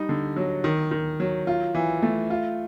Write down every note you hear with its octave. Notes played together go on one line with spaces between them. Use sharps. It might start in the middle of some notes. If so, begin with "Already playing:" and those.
Already playing: G3 D#4
D3
F#3
D#3
D#3
F#3
F4
E3
A3
F4